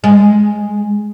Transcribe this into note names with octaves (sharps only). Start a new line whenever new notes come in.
G#3